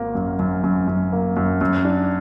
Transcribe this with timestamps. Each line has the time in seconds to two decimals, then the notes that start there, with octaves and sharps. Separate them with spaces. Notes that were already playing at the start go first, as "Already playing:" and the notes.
Already playing: G#1 A#3
0.15 F#2
0.39 F#2
0.64 F#2
0.88 F#2
1.12 A#3
1.37 F#2
1.61 F#2
1.85 D4